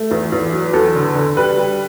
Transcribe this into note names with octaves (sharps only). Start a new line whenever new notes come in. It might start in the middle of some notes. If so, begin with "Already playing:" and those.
Already playing: A3
E2
E2
F#3
E2 A4
D3
D3
G3 B4
G3